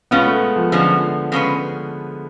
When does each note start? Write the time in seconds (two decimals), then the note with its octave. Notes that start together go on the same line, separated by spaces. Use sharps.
0.11 B2 G#3 B3 C#4 F4
0.27 A3
0.41 G#3
0.56 F3
0.72 F#2 D3 F3 G#3 C#4
1.32 C#3 G#3 C#4 G#4 B4